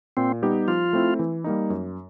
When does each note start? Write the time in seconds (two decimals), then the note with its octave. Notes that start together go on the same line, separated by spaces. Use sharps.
0.17 A#2 C4
0.42 G3 B3 D#4 G4
0.68 F3 F4
0.93 A3 C4 E4
1.19 E3
1.44 G3 A#3 D#4
1.70 F#2